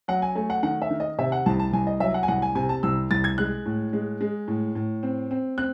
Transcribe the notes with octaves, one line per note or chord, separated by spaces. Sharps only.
F#3 F#5
G#5
A3 G#5
F#5
D#3 F#5
E5
D#3
D#5
C3 E5
F#5
C2 A5
A5
C2 G#5
D#5
F#3 E5
F#5
G#5
C2 F#5
G#5
C3 G#5
A5
C2 E6
C2 A6
G#6
G#3 F#6
A2
G#3
G#3
A2
A2
C4
C4
C4 F#6